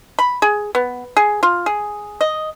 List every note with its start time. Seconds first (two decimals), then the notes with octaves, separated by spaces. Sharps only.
0.19 B5
0.42 G#4
0.75 B3
1.17 G#4
1.43 F4
1.66 G#4
2.21 D#5